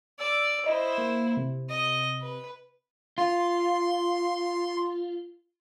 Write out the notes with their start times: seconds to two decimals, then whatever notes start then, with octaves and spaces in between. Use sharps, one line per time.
0.19 D5 E6
0.66 E4 C5 D#5
0.98 A#3
1.37 C3
1.70 D#5
2.21 B4
3.18 F4 C6